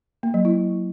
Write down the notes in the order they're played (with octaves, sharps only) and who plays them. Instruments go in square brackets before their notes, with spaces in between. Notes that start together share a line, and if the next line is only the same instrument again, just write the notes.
[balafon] A#3
F#3
E4